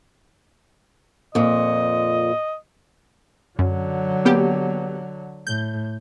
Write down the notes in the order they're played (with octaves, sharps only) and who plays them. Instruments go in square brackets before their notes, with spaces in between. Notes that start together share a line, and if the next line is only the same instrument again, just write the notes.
[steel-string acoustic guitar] F2 A#2 [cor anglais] D#5
[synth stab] F#2 [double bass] D3 F#3
[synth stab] A#3 B3 G4
[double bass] A2 [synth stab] G6